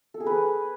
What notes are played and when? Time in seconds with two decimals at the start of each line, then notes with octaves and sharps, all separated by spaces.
0.14 A4
0.20 G#4
0.26 B4